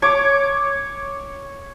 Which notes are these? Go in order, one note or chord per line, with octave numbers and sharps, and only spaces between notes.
C#5 D6